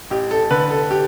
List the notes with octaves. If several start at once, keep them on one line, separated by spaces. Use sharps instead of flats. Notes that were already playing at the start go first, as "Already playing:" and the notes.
A1 G4
A4
D3 B4
A4
G4